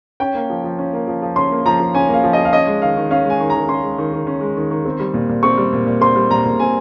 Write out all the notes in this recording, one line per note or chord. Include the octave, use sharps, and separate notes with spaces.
C#4 G5
A#3
F3
F3
C#4
A#3
F3
F3
C#4 C6
A#3
F3 A#5
F3
C#4 G#5
A#3 F5
F3
D#5
F3
F5
C#4 D#5
G#3
D#3 F5
D#3
C#4 F5
G#3 G#5
D#3
A#5
D#3
C#4 C6
G#3
D#3
D#3
C#4
G#3
D#3
D#3
C4
G3
A#2
A#2
C4 C#6
G3
A#2
A#2
C4 C6
G3
A#2 A#5
A#2
C4 G#5